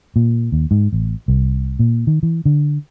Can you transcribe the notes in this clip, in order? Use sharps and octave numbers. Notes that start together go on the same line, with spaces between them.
A#2
D#2
G#2
A1
C2
A#2
D#3
E3
D3